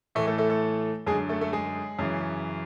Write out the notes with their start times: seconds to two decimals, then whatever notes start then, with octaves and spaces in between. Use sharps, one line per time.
0.15 A2 E3 A3 A4
0.27 A3 A4
0.38 A3 A4
0.50 A3 A4
1.06 F#2 G#3 G#4
1.11 D3
1.29 A3 A4
1.41 A3 A4
1.53 G#3 G#4
1.99 F#2 C#3 E3